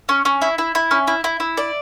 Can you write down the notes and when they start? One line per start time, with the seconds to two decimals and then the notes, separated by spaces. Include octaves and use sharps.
0.09 C#4
0.25 C#4
0.42 E4
0.58 E4
0.75 E4
0.91 C#4
1.07 E4
1.24 E4
1.40 E4
1.57 D5